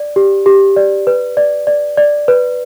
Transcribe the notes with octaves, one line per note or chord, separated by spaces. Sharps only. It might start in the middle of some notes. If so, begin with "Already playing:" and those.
Already playing: D5
G4
G4
D5
B4
D5
D5
D5
B4